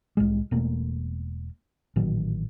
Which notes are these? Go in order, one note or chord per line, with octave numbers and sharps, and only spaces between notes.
C2 A2 G#3
E1 B2 A3 A#3
A1 A#2 D#3 F#3